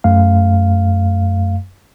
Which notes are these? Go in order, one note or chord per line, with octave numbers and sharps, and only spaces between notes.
F#2 A3 F5